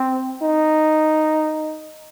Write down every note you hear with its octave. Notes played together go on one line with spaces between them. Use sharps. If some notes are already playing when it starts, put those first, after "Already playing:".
Already playing: C4
D#4